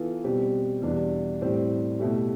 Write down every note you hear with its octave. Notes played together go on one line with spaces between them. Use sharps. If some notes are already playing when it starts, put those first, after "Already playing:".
Already playing: E3 B3 F4 A4
B2 G3 C4 G4
E2 B2 G3 D4
A2 G3 C4
B2 A3 E4 G4